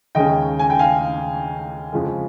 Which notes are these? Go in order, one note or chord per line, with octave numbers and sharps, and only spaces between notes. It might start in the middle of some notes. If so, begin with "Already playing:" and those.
D#2 C#3 G#3 C#4 D#5 G5
G#5
G5
F5 G#5
F2 C#3 F3 G#3